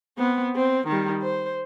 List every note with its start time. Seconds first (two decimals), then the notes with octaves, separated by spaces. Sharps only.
0.18 B3 C4
0.56 C4
0.88 D#3 G3
1.22 C5